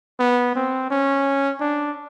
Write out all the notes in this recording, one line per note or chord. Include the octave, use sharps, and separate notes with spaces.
B3
C4
C#4
D4